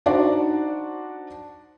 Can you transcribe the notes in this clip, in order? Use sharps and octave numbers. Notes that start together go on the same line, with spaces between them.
D4 D#4 F#4 C5 D5